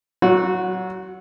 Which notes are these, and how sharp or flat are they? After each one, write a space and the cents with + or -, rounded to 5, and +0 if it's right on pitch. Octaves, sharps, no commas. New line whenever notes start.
F#3 +25 F#4 -20